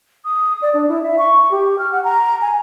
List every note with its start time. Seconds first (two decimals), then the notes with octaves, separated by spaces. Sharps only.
0.25 D#6
0.62 D5
0.74 D4
0.88 E4
1.03 E5
1.18 C#6
1.51 G4
1.78 F6
1.92 F#5
2.04 A#5
2.42 G#5